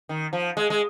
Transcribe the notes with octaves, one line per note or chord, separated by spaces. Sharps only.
D#3
F3
G#3
G#3